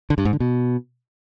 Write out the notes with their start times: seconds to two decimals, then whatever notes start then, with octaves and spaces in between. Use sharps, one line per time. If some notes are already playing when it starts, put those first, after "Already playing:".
0.10 D3
0.18 G2
0.25 G#2
0.33 D3
0.40 B2